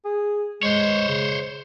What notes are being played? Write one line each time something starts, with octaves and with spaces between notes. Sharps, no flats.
G#4
G#3 C5 C#5
C#3